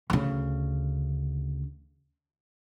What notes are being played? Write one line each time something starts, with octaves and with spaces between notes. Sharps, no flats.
D2 C#3